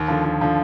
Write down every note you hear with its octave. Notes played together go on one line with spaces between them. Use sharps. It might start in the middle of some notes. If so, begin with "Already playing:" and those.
Already playing: D#2
D3 F3
D#2
D3 F3